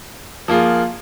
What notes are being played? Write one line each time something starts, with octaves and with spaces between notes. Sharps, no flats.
F3 A#3 F4 G#4